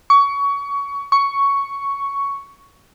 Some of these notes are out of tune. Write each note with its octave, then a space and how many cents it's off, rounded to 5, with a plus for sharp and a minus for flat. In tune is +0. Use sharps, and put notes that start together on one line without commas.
C#6 +25
C#6 +5